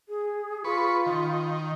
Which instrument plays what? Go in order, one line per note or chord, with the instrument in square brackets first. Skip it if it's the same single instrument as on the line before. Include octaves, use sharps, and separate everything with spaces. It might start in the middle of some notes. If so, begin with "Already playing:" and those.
[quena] G#4
[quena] F4 [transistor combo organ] B4 C#6
[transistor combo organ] D#3